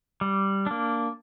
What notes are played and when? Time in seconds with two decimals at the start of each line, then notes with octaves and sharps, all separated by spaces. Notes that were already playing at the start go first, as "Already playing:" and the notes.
0.21 G3
0.66 A#3 D4